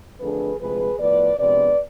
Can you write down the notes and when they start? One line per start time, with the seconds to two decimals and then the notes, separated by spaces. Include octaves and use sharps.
0.20 F2 D3 A3 D4 G#4 B4
0.60 D2 C3 F3 G#3 G#4 B4
0.99 A2 F3 B3 B4 D5
1.38 C3 F3 G#3 B3 D4 B4 D5